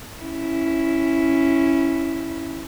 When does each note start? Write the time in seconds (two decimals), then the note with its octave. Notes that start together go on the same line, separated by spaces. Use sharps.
0.21 C#4 E4